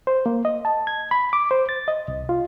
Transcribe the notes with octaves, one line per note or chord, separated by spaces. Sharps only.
C5
A#3
D#5
A5
G#6
B5
D6
C5
A6
D#5
C2
F4